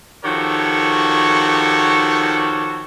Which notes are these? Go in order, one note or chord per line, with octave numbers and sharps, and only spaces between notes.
D#3 F3 F#4 G4 A4 C#5